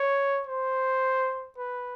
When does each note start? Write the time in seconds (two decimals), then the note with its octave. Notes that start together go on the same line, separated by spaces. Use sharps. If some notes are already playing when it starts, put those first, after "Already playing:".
Already playing: C#5
0.47 C5
1.58 B4